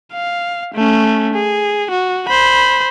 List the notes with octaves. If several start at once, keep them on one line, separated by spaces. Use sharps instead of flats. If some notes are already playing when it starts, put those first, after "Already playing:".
F5
A3 C#4
G#4
F#4
C5 B5